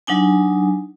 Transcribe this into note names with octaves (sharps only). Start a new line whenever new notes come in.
F#3 D4 D#4 G#5